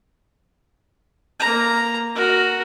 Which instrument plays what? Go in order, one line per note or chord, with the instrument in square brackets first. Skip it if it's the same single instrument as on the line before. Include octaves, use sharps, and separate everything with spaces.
[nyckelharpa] A#3 A#5
F#4 A#4